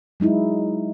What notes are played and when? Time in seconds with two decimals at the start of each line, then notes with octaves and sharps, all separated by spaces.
0.20 F#3 G#3 D#4 E4